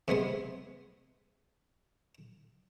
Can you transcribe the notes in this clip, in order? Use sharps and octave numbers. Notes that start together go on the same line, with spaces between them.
C3 G#3 B3 C6